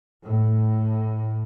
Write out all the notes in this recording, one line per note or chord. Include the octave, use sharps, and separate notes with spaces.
A2